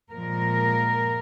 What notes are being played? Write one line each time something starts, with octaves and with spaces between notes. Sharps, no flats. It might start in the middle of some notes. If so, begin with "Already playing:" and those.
A#2 F3 G#3 A#4